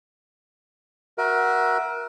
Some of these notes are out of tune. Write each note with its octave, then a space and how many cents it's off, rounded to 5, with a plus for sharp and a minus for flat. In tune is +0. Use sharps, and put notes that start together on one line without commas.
F#4 +0 A#4 +25 E5 +0